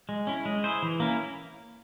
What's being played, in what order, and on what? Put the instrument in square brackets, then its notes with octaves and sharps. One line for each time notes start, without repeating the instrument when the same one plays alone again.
[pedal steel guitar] G#3
C#4 E4
G#3
E4 G#4 C5
E3
A#3 C#4 E4